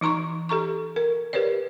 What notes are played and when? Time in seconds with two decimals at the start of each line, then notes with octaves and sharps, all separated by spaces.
0.01 E3 D#4 A#5 C6 C#6
0.49 G4 A4 A#5 C#6
0.96 A#4
1.33 G4 A#4 B4 C#5 D5